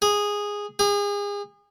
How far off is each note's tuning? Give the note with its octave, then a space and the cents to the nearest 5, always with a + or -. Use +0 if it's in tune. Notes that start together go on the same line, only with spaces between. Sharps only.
G#4 -10
G#4 -35